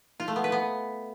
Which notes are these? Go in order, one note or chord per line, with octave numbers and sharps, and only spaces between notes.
F4
A3
B3
B4
B3